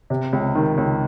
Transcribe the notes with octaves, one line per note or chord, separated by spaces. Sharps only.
C3
C#2
D#3
C#2